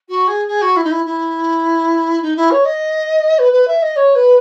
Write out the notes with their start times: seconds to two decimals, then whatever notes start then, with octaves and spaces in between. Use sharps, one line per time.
0.08 F#4
0.27 G#4
0.47 G#4
0.61 F#4
0.76 E4
0.83 D#4
0.91 E4
1.05 E4
2.22 D#4
2.36 E4
2.50 C#5
2.64 D#5
3.38 B4
3.52 B4
3.67 E5
3.82 D#5
3.96 C#5
4.15 B4